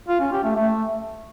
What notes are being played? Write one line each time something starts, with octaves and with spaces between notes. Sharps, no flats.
F4
C#4
G4
A3
A3